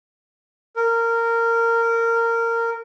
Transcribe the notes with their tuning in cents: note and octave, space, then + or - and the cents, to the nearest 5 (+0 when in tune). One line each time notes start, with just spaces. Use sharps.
A#4 -15